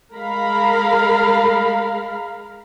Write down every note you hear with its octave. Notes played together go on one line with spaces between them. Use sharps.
G#3 A#4 F5 A#5 B5